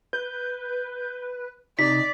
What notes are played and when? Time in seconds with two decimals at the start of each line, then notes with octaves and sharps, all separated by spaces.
0.13 B4 G6
1.79 C3 D#4 D5 B6